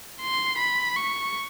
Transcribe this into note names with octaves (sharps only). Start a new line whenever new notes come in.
C6
B5
C#6